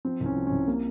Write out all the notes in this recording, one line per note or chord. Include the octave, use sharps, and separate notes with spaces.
F3 C4
C2
C#4
F3
C2 C#4
C3 A#3